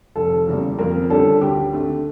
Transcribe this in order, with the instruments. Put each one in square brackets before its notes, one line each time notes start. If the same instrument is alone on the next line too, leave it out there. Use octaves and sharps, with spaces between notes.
[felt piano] F1 [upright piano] A4
[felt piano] E2 C#3 G3 A#3
[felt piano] F2 [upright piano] A#4
[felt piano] D3 G3 C#4 [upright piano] A4
[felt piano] D2 [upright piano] G4
[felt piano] D3 A3